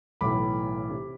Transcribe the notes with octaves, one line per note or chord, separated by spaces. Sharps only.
B1 A2 E3 B5 D6
C3